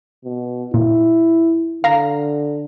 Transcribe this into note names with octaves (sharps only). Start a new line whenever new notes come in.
B2
A#2 E4
D3 F5 A#5